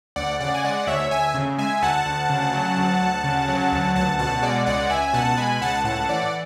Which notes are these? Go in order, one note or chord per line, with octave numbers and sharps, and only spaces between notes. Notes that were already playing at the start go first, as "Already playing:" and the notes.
D2 D5 F#5
C#3 D5 F#5
G#5
G#3 D5 F#5
D2 C#5 E5
D2 E5 G#5
C#3
G#3 E5 G#5
D2 F#5 A5
D2
C#3
F#3
D2
D2
C#3
F#3
D2
C#2 F#5 A5
B2 F#5 A5
G#3 D5 F#5
C#2 D5 F#5
C#2 E5 G#5
B2 F#5 A5
G#3 G#5 B5
C#2 F#5 A5
A2 F#5 A5
E3 D5 F#5